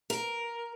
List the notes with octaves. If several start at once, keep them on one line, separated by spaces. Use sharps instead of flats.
A#4